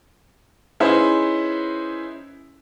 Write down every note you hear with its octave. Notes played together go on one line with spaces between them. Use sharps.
C#4 D#4 E4 G#4 B4 C5